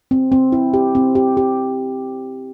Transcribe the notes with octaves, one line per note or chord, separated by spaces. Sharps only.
C4
C4
E4
G4
C4
G4
G4